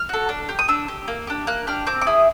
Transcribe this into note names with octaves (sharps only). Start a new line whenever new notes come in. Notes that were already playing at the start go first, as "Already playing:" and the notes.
Already playing: F6
F#4 A4
D4
G4
D#6
D4 E6
G4
A#3
D4 G4
A#3 F#6
D4 G4 F6
C4 D6
D6
E4 G#4 D#6